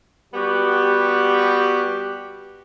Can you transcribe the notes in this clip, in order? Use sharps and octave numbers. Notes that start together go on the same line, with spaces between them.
G3 B3 F#4 G4